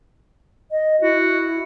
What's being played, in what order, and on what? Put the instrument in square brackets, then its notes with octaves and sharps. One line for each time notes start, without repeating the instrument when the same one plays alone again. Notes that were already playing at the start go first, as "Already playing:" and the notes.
[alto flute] D#5
[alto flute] E4 [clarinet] F#4